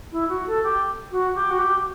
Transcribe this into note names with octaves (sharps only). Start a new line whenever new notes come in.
E4
F#4
A4
G4
F#4
G4
F#4
G4